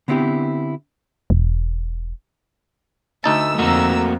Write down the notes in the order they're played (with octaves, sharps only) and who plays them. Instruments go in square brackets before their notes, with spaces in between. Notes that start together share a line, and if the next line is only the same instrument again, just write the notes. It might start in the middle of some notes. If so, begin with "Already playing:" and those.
[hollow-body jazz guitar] D3 B3 C4 E4 G4
[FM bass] E1
[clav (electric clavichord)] D2 D#4 A5 [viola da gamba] A3 [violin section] E6
[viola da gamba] F2 [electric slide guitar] A3 A#3 F#4 [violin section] A#5 E6